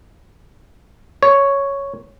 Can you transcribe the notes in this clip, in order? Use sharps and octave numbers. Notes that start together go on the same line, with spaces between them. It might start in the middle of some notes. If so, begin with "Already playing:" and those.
C#5